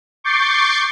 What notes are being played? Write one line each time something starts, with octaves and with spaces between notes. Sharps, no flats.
C#6 D6 G6 A6 C7